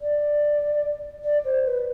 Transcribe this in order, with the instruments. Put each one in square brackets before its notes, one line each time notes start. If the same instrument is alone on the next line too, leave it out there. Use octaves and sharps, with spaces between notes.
[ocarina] D5
D5
C5
B4